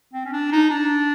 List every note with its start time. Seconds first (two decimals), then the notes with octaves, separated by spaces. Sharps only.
0.13 C4
0.25 C#4
0.33 D4
0.52 D#4
0.70 D4